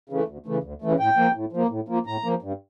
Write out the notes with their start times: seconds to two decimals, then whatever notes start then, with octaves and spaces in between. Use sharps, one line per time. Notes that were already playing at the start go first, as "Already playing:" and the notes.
0.09 C#3 E3 A3
0.28 D2
0.46 C#3 E3 A3
0.63 D2
0.82 C#3 E3 A3
0.99 A2 G5
1.17 F3 A#3
1.35 A2
1.53 F3 A#3
1.70 A2
1.88 F3 A#3
2.06 A2 A#5
2.24 F3 A#3
2.42 G2